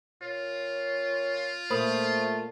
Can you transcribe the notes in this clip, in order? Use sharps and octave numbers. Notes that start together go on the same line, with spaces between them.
A#2 F4 C#5
A#2 A3 A#3 C5 B5 D#6